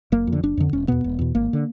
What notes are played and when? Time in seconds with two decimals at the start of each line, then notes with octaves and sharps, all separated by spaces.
0.12 F#1 A#3
0.27 F2
0.32 D3
0.43 F#1 D4
0.57 F2 D3
0.73 E1 C#4
0.88 E2 B2 B3
1.04 E1
1.19 E2 B2
1.35 G#1 A#3
1.53 D3